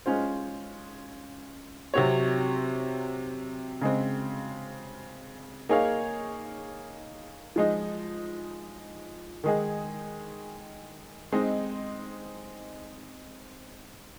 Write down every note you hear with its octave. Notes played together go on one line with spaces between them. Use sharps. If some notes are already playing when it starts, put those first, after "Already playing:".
G#3 C#4 F4 C5
C3 F#3 C4 F#4 C#5
C#3 G#3 C4
A#3 D#4 G#4 C#5 F5
F3 G#3 D#4
D#3 G#3 D#4 G#4
G#3 C4 D#4